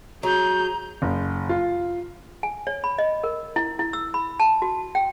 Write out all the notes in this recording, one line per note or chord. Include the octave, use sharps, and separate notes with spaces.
F#3 G#4 A#5 G6
F#1
F4
G#5
C#5
B5
D#5
A#4
E4
E4
E6
B5
A5
F#4
G5